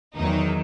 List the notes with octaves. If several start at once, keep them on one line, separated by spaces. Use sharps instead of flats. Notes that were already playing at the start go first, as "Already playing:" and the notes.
E2 D#3 F#3 D#4